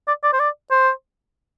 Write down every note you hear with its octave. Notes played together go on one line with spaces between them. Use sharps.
D5
D5
C5
D5
C5